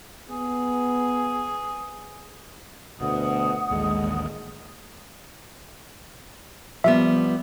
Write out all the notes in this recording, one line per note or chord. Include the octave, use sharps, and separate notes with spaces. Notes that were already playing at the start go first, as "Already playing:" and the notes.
B3 G#4
D2 B2 F#5 D#6
A1 D#2 D3 G#3
F3 G3 B3 E5